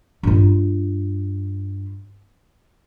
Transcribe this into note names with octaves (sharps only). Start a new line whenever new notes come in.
G2 F4